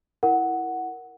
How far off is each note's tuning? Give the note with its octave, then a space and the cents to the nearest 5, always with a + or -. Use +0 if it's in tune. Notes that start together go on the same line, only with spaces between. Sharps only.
E4 +0 A#4 +0 F#5 +0